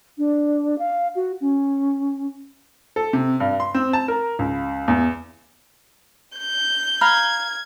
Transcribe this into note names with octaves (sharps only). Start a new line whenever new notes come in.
D4
F5
F#4
C#4
A4
C3
G2
C6
C4
A5
A#4
C#2
E2
G6
F5 A#5 B5 F6 G#6